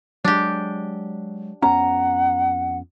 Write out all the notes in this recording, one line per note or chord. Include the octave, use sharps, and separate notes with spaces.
F#3 G#3 D4 G4
F2 B3 C#4 F#5 A#5